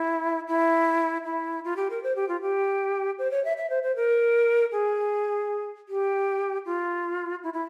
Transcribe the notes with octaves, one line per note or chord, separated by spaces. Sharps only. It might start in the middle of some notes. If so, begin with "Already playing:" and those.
Already playing: E4
E4
E4
F4
G4
A#4
C5
G4
F4
G4
C5
C#5
E5
E5
C5
C5
A#4
G#4
G4
F4
E4
E4